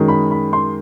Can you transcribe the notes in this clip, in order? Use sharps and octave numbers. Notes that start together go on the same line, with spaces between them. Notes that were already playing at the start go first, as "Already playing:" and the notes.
Already playing: F#2 D#3 G#3
B5
B5
C6